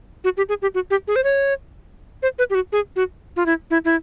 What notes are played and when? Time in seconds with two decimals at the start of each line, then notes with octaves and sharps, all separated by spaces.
0.24 F#4
0.37 G4
0.49 G#4
0.62 G4
0.75 F#4
0.90 G4
1.08 G#4
1.16 C5
1.24 C#5
2.23 C5
2.39 B4
2.50 G4
2.55 F#4
2.72 G#4
2.96 F#4
3.36 F4
3.46 E4
3.71 E4
3.85 E4